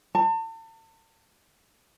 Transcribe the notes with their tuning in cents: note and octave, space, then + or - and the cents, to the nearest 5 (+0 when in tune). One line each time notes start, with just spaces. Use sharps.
A5 +35